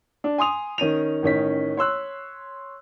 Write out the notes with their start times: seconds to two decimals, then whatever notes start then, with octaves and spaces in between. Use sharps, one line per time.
0.24 D4
0.38 G#5 C6 D#6 F7
0.78 D#3 C#4 D#7 F7
1.23 A1 D#3 C#4 B6
1.77 C#5 C6 E6 F#6